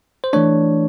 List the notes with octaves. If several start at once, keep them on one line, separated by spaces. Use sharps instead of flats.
C5
E3 A3 D4 C#5